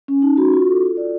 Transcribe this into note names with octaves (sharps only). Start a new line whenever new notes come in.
C#4
D#4
F#4
F4
A4
F4
D5